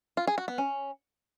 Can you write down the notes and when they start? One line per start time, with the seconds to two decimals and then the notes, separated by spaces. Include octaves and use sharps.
0.17 F4
0.27 G#4
0.38 F#4
0.48 B3
0.58 C#4